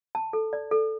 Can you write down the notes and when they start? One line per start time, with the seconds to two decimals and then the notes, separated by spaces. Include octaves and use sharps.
0.15 A5
0.33 A4
0.53 D5
0.71 A4